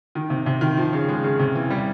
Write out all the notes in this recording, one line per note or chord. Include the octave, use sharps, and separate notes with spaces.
D#3
C3
C3
D#3
F3
C#3
G#3
C#3
C3
E3
G3